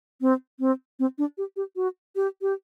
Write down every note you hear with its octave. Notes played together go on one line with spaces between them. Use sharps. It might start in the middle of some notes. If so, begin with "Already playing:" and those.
C4
C4
C4
D4
G4
G4
F#4
G4
G4